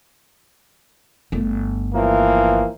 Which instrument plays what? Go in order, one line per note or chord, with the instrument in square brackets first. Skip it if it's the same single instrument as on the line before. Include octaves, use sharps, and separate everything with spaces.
[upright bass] G1 A3
[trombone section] E3 F3 A#3